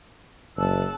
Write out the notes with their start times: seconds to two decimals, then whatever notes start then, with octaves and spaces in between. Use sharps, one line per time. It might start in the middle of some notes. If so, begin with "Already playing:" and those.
0.57 F#1 A5 E6 F#6